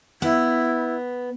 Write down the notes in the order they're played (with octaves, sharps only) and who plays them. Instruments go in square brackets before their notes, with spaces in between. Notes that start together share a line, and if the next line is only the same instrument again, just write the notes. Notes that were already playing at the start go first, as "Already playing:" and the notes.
[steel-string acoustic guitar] B3 [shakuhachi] E4